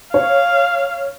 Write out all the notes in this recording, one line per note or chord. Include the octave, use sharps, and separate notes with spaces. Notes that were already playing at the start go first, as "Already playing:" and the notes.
C#5 F5